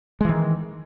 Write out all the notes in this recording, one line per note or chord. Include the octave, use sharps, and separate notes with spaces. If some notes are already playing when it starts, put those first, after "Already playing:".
D#3 E3 G#3